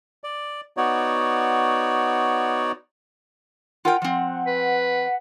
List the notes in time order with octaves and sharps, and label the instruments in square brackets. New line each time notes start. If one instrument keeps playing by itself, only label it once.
[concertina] D5
B3 D#4 F#4 C#5 D5
[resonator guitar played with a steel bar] F4 A#4 G5 [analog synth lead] F#5
[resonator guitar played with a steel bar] F3 C4
[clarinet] B4